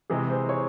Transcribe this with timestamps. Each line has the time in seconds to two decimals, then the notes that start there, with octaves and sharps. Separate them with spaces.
0.10 C3 E3 G#3 G#4
0.29 C5
0.49 C#5